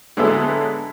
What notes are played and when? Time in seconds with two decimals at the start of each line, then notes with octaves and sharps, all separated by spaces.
0.17 D3 F#3 G#3 B3 E4 A4